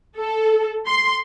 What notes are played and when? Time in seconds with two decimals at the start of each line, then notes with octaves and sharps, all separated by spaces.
0.18 A4
0.87 C6